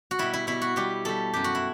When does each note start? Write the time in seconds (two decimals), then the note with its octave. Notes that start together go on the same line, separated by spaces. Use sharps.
0.11 F#4
0.19 B2 G3 E4
0.33 E4
0.47 B2 G3 E4
0.62 F#4
0.76 B2 G3 G4
1.05 B2 G3 A4
1.34 F#2 E3 G3 G4
1.44 F#4
1.55 E4